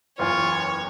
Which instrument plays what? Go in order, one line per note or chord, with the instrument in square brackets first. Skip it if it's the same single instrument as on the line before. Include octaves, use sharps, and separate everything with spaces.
[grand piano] F#1 E2 [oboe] F4 [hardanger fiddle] C#5